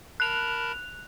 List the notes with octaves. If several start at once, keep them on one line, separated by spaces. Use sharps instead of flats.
A#4 A5 B5 F#6 F7